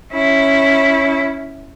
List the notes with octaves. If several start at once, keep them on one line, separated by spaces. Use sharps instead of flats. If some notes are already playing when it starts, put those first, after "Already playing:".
C#4 E4